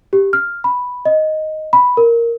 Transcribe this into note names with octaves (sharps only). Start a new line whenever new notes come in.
G4
F6
B5
D#5
B5
A#4